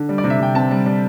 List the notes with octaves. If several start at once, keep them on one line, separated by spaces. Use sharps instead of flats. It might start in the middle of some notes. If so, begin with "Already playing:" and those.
Already playing: D3
G3
D5
C3
E5
C3 G5
C4 A5
G3
G3